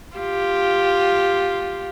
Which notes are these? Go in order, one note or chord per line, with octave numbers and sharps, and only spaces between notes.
F4 G4